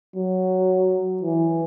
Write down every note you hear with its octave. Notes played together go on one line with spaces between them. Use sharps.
F#3
E3